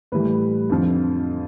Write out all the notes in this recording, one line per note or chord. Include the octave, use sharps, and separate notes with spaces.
A2 E3 G3 B4
F2 D3 F3